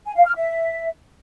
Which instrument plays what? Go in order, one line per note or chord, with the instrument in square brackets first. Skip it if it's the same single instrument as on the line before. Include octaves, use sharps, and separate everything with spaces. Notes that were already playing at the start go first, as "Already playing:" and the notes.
[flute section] G#5
F5
F6
E5